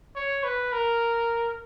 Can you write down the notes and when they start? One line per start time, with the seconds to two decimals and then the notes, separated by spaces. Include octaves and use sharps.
0.15 C#5
0.44 B4
0.73 A#4